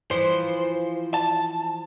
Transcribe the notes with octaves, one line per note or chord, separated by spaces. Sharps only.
E3 F3 C5
A5